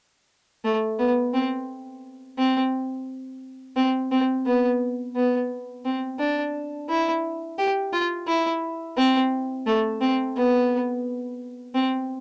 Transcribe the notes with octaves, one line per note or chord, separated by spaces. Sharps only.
A3
B3
C4
C4
C4
C4
B3
B3
C4
D4
E4
G4
F4
E4
C4
A3
C4
B3
C4